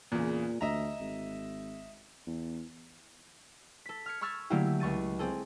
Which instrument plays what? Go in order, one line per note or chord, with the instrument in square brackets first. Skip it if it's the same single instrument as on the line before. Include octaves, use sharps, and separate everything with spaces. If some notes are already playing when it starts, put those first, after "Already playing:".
[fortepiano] E2 C#3 [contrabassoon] A#2
[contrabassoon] D2 [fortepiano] D#5 E5 A#5
[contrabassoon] G#1
E2
[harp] A4 B6
F6 G#6 C#7
B5 C#6 E6 F6 G#6 A6
D3 F#3 A3 A#3 E4 G4
C#2 C#6 A6 D#7
C4 G#4 A4